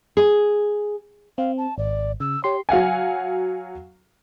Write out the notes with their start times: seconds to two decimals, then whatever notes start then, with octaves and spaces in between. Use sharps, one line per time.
0.17 G#4
1.38 C4 F5
1.58 A5
1.78 G#1 D5
2.20 C#3 E6
2.44 G4 C#5 C6
2.69 F#3 F5 F#5 G#5